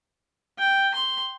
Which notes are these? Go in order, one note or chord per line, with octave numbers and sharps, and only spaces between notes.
G5
C6